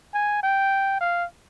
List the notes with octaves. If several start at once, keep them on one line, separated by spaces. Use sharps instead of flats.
G#5
G5
F5